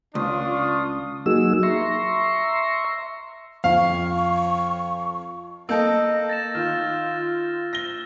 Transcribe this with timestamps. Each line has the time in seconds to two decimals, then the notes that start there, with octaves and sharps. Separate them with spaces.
0.15 C#2 D4 F4 C#6 D#6
1.26 F#3 A#3 D#4 F#4 G#4 E6
1.63 E5 A#5 C6 C#6
3.64 F2 F5 C#6
5.69 A#3 A4 D#5 E6 G6
6.29 A6 A#6 E7
6.55 D#3 F4 F6
7.73 A#6 G7